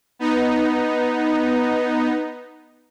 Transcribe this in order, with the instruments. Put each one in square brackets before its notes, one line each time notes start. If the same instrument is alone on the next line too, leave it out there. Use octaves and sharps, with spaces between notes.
[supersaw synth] B3 D#4